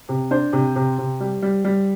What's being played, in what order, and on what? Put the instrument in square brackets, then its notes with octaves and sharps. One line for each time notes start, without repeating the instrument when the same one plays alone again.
[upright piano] C3
D4 C5
C3
C3
C3
G3
G3
G3